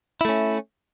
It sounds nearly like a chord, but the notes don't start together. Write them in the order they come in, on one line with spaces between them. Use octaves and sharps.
E4 A3 C#4